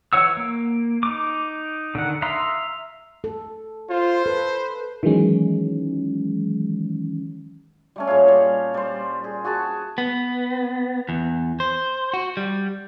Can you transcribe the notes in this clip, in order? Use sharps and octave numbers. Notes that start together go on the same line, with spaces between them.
E3 C#5 F#5 E6
A#3
D#4 D6
D3 D#3 F#5
E5 F5 A#5 C6 D#6
A4
F4 C5
A4 B4
D#3 E3 F#3 G#3 C#4
G3 A3 C#4
A#2 G#4 C#5 F5
G3
G3 C5
G#4
F#4 G#4 A5 C#6
B3
E2
C5
F#4
G3